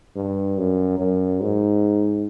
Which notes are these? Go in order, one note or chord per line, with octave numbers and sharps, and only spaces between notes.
G2
F#2
F#2
G#2